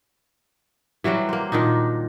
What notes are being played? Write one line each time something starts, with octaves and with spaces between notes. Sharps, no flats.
E3 F#3 G3 F#4
A#3 C5
A#2 D#3 D4 D#4